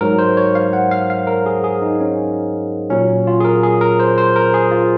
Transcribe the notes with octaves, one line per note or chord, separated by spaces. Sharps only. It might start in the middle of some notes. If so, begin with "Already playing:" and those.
G#2 F#3 A#4
C5
C#5
F5
F#5
F5
F5
A#4
G#4
G#4
D#4
C#4
A#2 F#3 C#4
F4
G#4
A#4
G#4
A#4
C5
C5
A#4
G#4
F4